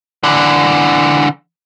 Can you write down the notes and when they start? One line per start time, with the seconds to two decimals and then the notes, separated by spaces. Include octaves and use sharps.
0.23 D3 E3